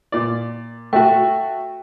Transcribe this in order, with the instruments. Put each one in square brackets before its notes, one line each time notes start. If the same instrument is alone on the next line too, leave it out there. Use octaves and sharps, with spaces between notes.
[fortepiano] A#2 D5
[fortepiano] A3 F#4 [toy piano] G5